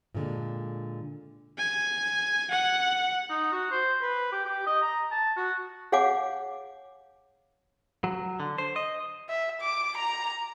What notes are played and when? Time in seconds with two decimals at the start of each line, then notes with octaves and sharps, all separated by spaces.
0.15 A#2 D3 G#3
1.58 G#5
2.51 F#5
3.30 D#4
3.52 F#4
3.71 C5
4.02 B4
4.32 G4
4.45 G4
4.67 D#5
4.82 A#5
5.12 A5
5.37 F#4
5.92 G#4 C#5 F5 F#5 G#5 D6
8.04 F#3
8.40 D3
8.58 C5
8.76 D#5
9.29 E5
9.60 D6
9.97 A#5